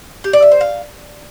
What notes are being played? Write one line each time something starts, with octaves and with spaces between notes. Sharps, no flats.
G4
D5
E5
C5
F5